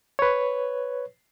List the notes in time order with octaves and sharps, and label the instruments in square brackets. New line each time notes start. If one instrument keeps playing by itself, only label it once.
[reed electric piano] B4 C#5